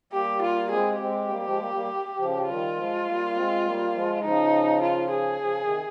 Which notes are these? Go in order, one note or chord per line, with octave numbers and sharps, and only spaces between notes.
G3 A#3 G4
F4
G#3 C4 G#4
G#3 C4 G4
G3 A#3
F3 G#3
G3 A#3
G3 A#3
C#3 F3
D#3 G3 F4
F3 G#3
G3 A#3
G#3 C4
G3 A#3
F3 G#3
C#3 F3 D#4
F4
G#4
C#3 F3
C3 D#3